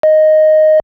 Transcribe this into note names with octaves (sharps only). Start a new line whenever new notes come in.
D#5